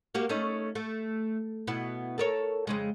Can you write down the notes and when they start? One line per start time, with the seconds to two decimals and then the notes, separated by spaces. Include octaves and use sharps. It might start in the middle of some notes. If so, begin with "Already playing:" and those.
0.15 A#3 F#4 G4
0.29 A3 C#4 D#4
0.75 A3
1.67 B2 B3 E4
2.18 A4 A#4 C#5
2.67 F2 C#3 G#3